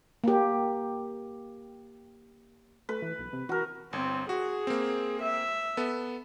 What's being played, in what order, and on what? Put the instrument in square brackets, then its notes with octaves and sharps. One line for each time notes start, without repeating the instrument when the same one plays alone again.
[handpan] A#3 G4
[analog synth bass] A3 [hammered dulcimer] B4
[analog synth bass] E3
B1
C3
[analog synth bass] E3 [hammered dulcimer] F#4 A#4
[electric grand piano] G1 [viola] C4
[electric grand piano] F#4 [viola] G#4
[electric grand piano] A#3 C4
[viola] E5
[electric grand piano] B3 A4